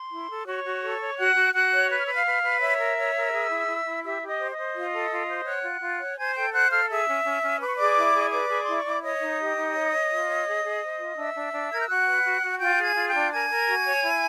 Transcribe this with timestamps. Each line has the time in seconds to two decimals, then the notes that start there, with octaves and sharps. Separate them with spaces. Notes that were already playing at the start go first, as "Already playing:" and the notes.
Already playing: C6
0.11 E4
0.29 A4
0.46 F#4 C#5 C#6
0.64 F#4
0.82 A4
1.00 C#5
1.17 F#4 F#5 F#6
1.35 F#4
1.53 F#4 F#5 F#6
1.72 C#5
1.90 B4 F#6
1.98 F6
2.06 B4 E6
2.15 F5 F6
2.25 B4
2.43 B4
2.60 C#5 E5 E6
2.79 A#4
2.97 C#5
3.15 A#4
3.32 G#4
3.50 E4
3.68 E4
3.85 E4
4.03 G4 E5 E6
4.21 G4
4.27 D#5 D#6
4.40 C5
4.51 D#5 D#6
4.58 C5
4.75 F4
4.92 A4
5.11 F4
5.28 C5
5.46 C#5 F#5 F#6
5.64 F4
5.82 F4
5.99 C#5
6.17 C5 G#5 G#6
6.35 A4 G5 G6
6.53 C5 F#5 F#6
6.71 A4 F5 F6
6.89 G#4 E5 E6
7.07 C#4
7.24 C#4
7.42 C#4
7.61 B4 D6
7.68 C#6
7.76 G#4 D5 D6
7.97 E4
8.14 G#4
8.32 B4 D5 D6
8.48 G#4 B5
8.62 E4 C6
8.76 C#6
8.85 E4 D6
9.03 C#5 D#5 D#6
9.21 D#4
9.39 G4
9.57 D#4
9.74 C#5
9.92 C#5
10.10 F4
10.28 C#5
10.46 G#4
10.64 G#4
10.82 C5
10.99 F4
11.17 D4 E5 E6
11.36 D4
11.53 D4
11.71 A#4 G#6
11.80 G6
11.88 F#4 F#5 F#6
12.07 B4
12.25 F#4
12.42 F#4
12.60 F4 G5 G6
12.78 G#4
12.84 G#5 G#6
12.95 F4
13.08 G5 G6
13.14 D4
13.32 A#4 G#5 G#6
13.50 A#4
13.68 F#4
13.85 C#5
14.03 E4